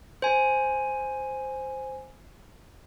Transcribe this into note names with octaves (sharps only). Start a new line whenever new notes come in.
C5 G#5